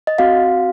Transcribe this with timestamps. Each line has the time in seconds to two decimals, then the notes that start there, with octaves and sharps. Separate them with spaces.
0.07 D#5
0.18 C4 F#4 F5